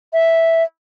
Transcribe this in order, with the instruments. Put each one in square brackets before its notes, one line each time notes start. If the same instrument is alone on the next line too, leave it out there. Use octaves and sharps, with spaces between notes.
[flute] E5